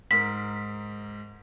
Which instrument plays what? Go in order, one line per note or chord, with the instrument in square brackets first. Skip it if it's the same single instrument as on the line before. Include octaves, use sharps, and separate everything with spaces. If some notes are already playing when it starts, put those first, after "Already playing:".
[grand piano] G#2 A#4 [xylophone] B6